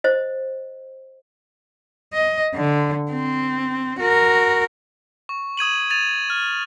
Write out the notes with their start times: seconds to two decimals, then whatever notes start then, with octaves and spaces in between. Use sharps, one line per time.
0.04 C5 D#5
2.13 D#5
2.55 D3
3.11 C4
4.00 F#4 A#4
5.29 C#6
5.57 D#6 G#6 D#7 F#7
5.90 G#6 A6 D#7 F7
6.30 F6